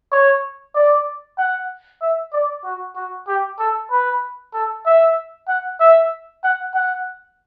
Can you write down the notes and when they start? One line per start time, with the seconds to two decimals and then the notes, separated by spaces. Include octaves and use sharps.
0.12 C#5
0.75 D5
1.38 F#5
2.01 E5
2.33 D5
2.64 F#4
2.96 F#4
3.28 G4
3.59 A4
3.91 B4
4.54 A4
4.86 E5
5.48 F#5
5.80 E5
6.43 F#5
6.74 F#5